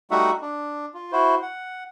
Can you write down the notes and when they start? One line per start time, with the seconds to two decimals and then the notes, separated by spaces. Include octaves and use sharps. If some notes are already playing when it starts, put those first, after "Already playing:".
0.11 G3 A3 D#4 F#4 E5 F#5
0.42 D4
0.94 F4
1.12 E4 F#4 C5
1.42 F#5